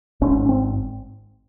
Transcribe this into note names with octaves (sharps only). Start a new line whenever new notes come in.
G#1 G#2 C#4
C#4
C4